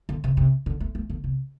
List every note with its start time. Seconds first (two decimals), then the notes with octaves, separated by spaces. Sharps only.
0.09 D3
0.24 C3
0.37 C3
0.66 D3
0.80 A3
0.95 A3
1.10 D3
1.24 C3